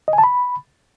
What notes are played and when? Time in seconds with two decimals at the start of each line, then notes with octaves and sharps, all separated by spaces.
0.08 D#5
0.13 G#5
0.18 A5
0.24 B5